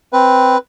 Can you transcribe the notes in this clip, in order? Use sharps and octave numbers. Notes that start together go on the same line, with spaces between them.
C4 B4